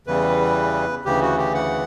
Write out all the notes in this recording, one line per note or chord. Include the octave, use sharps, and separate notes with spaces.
E2 C#3 E3 G3 B4
D2 C#3 E3 G4
F#4
G4
F#5